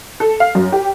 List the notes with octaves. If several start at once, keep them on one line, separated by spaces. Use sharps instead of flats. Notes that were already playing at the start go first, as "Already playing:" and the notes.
A4
F5
F#2
G4